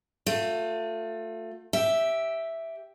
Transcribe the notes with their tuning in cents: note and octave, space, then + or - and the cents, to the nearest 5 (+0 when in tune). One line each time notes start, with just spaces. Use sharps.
A3 +25 F4 +35
G4 +0 E5 +0